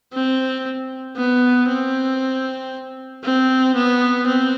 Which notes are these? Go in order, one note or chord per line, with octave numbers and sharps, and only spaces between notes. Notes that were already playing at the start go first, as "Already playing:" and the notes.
C4
B3
C4
C4
B3
C4